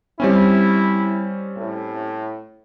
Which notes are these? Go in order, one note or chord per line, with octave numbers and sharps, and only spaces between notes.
G3 C4 C#4 E4
A2